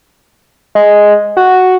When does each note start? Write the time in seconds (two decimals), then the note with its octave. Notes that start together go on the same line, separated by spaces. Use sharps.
0.75 G#3
1.37 F#4